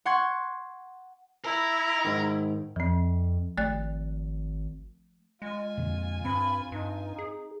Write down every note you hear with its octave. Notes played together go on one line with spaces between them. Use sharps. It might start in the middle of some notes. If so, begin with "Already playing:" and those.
F#5 C6 C#6 G#6
E4 A#4
G#2 D#3
F2 F3 C4
G#1 A3 D5 F#6
G#3 F4 G#5
F2 A#2 D3
G2 C4 B5
G2 D#4
G#4